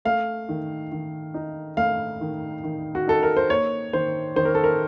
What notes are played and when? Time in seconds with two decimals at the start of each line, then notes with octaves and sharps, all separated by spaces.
0.05 A3 F5
0.49 D#3
0.92 D#3
1.34 D#4
1.77 A3 F5
2.21 D#3
2.64 D#3
2.95 F#4
3.07 D#4 A4
3.23 A#4
3.37 C5
3.50 A#3 C#5
3.93 D#3 C5
4.36 D#3 C5
4.45 A#4
4.55 A4
4.64 A#4